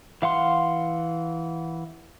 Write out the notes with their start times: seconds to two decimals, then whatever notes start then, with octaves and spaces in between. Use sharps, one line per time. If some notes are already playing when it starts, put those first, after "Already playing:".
0.22 E3 F5 F#5 C6